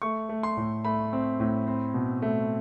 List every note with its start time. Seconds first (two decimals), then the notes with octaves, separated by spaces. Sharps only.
0.02 A3 C#6
0.29 A3
0.43 C6
0.57 A2
0.85 A3 B5
1.13 C4
1.40 A2
1.68 C4
1.94 B2
2.22 A3